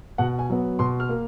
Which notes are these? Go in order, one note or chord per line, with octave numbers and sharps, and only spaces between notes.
B2 F#5
G#5
F#3 B3
B2 C6
F6
A#3